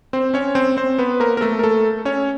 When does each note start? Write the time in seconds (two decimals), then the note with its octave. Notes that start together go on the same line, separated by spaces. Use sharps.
0.13 C4 C5
0.34 C#4 C#5
0.55 C4 C5
0.77 C4 C5
0.98 B3 B4
1.20 A#3 A#4
1.37 A#4
1.41 A3 A4
1.59 A#4
1.63 A3 A4
2.05 C#4 C#5